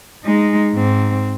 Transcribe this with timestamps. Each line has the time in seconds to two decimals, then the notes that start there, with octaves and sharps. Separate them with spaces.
0.24 G#3 D#4
0.73 G#2 C4